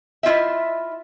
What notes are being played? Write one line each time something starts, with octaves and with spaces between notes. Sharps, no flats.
E4 F4 D#5 E5